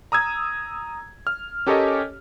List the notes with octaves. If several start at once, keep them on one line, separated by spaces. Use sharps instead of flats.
A#5 D#6 E6 G#6
F6
C#4 G4 A4 A#4 C#5 D#5